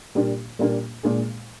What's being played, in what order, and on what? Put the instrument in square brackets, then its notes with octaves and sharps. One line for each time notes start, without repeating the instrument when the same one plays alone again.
[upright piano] A#2 G3 A#3 D4
A#2 G3 A#3 D4
A#2 G#3 D4 G#4